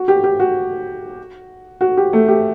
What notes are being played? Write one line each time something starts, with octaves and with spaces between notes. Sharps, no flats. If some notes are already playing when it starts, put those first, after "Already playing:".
Already playing: F#4
G4
G4
F#4
F#4
G4
A3
G4